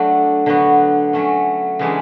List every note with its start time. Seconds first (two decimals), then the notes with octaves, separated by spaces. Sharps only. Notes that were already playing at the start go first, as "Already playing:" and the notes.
Already playing: F#3 A3 B3 D4
0.46 D3 F#3 B3 F#4
1.13 F#3 A3 C#4
1.79 C#3 E3 G#3 D4